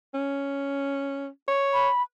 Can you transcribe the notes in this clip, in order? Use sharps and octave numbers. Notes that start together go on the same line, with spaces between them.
C#4
C#5
B5